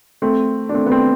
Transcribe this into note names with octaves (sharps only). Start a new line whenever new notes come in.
A3 C4
D4
A3 C4
B3
A3 C4